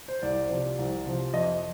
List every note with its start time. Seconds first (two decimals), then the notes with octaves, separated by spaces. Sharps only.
0.08 C5
0.22 C2 D5
0.49 C3 F3
0.79 C2
1.06 C3 F3
1.34 F2 D#5